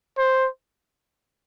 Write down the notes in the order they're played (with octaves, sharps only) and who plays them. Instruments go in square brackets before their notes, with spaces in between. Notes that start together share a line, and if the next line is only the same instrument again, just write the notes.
[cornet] C5